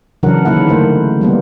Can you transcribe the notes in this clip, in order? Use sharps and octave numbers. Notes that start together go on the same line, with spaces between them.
C#3 E3 F#3 D4 A#4 F#5
D3 D#3 A#3 E4 F#5
D3 A3 C5
G3 A#3 B3